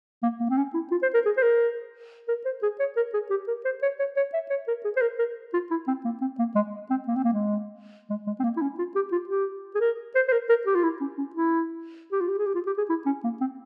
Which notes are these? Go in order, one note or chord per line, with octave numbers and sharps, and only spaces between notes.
A#3
A#3
C4
C#4
E4
F4
C5
A#4
G#4
C5
A#4
A#4
C5
G#4
C#5
A#4
G#4
G4
A#4
C5
C#5
C#5
C#5
E5
C#5
A#4
G#4
C5
A#4
A#4
F4
E4
C4
A#3
C4
A#3
G#3
C4
A#3
C4
A#3
G#3
G#3
G#3
C4
A#3
E4
C#4
F4
G4
F4
G4
G#4
A#4
C5
C5
A#4
A#4
G4
F4
E4
C#4
C#4
E4
G4
F4
G4
G#4
G4
F4
G4
G#4
E4
C#4
A#3
C4